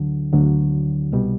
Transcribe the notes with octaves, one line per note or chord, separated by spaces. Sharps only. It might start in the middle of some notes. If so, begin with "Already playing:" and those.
Already playing: D2 D3 F#3
D2 D3 F#3
C2 B2 G3